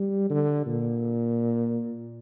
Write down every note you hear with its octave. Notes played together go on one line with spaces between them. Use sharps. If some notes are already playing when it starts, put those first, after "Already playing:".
Already playing: G3
D3
A#2